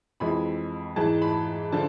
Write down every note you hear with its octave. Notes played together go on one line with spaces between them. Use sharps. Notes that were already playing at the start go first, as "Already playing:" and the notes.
F2 E3 G#3 B5
G#2 E3 G#3 A5
B5
D3 F3 A5